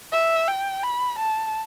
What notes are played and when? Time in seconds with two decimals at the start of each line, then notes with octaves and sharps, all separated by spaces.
0.12 E5
0.48 G5
0.83 B5
1.19 A5